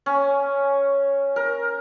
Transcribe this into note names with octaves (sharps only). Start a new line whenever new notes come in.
C#4
A#4